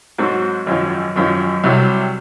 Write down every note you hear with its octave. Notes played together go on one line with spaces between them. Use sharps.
G#2 F#3 C4 F#4
G#1 F#2 F3
G#1 F#2 F3
C2 C3 F#3